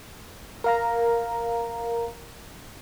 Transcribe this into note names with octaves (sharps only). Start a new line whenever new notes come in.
A#4 F5 A#5